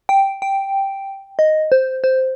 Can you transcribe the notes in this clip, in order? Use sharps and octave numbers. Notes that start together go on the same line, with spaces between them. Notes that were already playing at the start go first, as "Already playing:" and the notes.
G5
G5
D#5
C5
C5